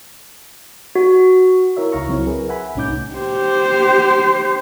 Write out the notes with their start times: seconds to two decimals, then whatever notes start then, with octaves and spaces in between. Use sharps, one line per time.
0.95 F#4
1.77 E4 A#4 C#5 E5
1.92 C#2 D#4 F5 A#5 C#6
2.08 C#2 F#3 C4 E4 F#4 C#5
2.27 G#4 A#4 B4
2.49 E5 F#5 G#5 B5
2.75 C2 A2 C#4 D#4 D6 G6
3.15 G4 C5